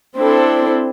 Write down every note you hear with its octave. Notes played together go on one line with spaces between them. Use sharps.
C4 D4 E4 A4